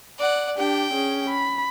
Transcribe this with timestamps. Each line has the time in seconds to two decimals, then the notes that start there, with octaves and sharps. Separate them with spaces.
0.18 D5 F#5
0.58 D4 G4 G5
0.94 C#4 G#4
1.29 B5